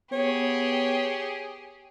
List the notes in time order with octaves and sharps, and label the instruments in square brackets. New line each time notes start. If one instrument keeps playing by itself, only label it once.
[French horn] B3 [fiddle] G4 G#4 [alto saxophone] C#5